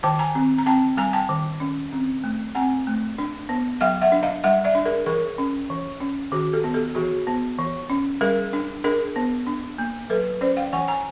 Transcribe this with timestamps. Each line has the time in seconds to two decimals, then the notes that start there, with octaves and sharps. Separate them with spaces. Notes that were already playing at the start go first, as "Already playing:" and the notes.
0.03 D#3 G5 A5
0.19 G#5 A#5
0.35 C4
0.58 A#5
0.66 C4 G5 A5
0.97 G3 G#5 A#5
1.13 G5 A5
1.29 D#3
1.60 C#4
1.92 C4
2.24 A3
2.55 C4 F#5 G#5
2.87 A3
3.18 D4
3.49 B3
3.81 F#3 F5 G5
4.02 E5 F#5
4.12 D4
4.23 D#5 F5
4.44 G3 E5 F#5
4.65 D5 E5
4.75 D4
4.85 G#4 A#4
5.06 E3 G#4 A#4
5.38 C#4
5.70 E3
6.00 C#4
6.32 D#3 F#4 G#4
6.53 G4 A4
6.64 B3
6.74 G4 A4
6.95 E3 F#4 G#4
7.27 B3
7.58 E3
7.90 C#4
8.21 G3 G#4 A#4
8.53 D4
8.84 D4 G#4 A#4
9.16 B3
9.47 D4
9.78 A#3
10.10 F#3 A4 B4
10.41 C#4 C5 D5
10.57 F5 G5
10.73 E3 F#5 G#5
10.88 G#5 A#5